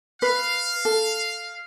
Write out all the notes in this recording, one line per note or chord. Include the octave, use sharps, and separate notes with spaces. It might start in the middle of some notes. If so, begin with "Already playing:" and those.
B4 F5
A4